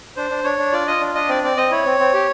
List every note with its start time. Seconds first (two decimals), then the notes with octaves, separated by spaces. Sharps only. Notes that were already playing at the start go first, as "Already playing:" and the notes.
0.17 D4 C5
0.30 D4
0.44 D4 C#5
0.59 D4
0.72 F4 D5
0.87 F4 D#5
1.01 D4
1.14 D4 D#5
1.29 C4 D5
1.43 C4 D5
1.57 C4 D#5
1.71 E4 C#5
1.86 C4
1.99 C4
2.14 G4